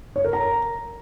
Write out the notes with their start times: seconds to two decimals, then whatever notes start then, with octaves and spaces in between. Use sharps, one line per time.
0.16 C#5
0.24 A#4
0.33 A#5